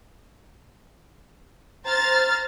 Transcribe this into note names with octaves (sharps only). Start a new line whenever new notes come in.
C5 A#5 F6 A6